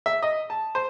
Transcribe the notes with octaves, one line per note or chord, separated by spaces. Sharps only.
E5
D#5
A5
C5